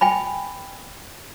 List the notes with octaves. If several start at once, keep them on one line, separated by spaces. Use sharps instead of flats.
G5 G#5 B5